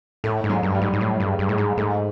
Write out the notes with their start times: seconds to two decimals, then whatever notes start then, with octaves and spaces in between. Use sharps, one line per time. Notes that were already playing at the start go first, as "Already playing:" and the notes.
0.24 A2 A3
0.44 G#2
0.50 F#3
0.63 G2
0.75 G3
0.82 G#2
0.93 G#2
1.01 A2 A3
1.20 G2
1.26 G#3
1.39 G2
1.49 A2 G#3
1.58 G#2
1.77 G#2 A3